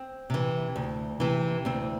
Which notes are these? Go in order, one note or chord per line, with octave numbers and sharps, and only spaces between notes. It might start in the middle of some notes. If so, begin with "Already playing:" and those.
Already playing: C4
C3 E3
D2
C3 E3
D2 C4